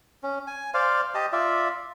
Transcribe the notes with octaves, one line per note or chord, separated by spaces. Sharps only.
C#4
G#5
C5 D5 F5
G4 D#5 A5
F4 D5 E5